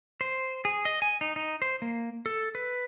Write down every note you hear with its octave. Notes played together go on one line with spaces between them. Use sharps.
C5
G#4
D#5
G#5
D#4
D#4
C5
A#3
A4
B4